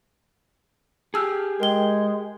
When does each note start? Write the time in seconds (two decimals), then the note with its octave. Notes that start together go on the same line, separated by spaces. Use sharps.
1.14 G4 G#4 A5 E6 F6
1.60 G#3 A#4 G5 G7